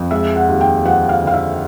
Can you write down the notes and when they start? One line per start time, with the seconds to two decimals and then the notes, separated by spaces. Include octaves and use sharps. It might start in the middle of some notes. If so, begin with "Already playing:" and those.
Already playing: F2
0.11 G#3 E5
0.36 F#5
0.48 D#2
0.61 G5
0.85 F3 F#5
1.09 F5
1.22 D3 F5
1.34 E5